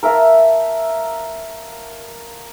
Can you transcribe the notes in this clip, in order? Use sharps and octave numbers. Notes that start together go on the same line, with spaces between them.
A#4 E5 F5 A5